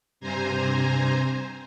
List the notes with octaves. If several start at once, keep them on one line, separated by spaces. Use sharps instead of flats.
G2 C3 C5 G#5 A#5